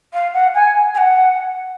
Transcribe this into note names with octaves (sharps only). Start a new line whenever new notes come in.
F5
F#5
G#5
G#5
F#5